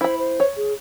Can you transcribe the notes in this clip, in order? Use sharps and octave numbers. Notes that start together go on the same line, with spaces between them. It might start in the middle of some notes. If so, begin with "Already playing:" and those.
E4 C5 B5
C5
C#5
G#4